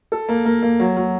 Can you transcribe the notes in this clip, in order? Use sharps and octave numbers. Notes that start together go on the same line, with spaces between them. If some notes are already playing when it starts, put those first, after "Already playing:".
A4
A#3
A#3
A#3
F#3
F#3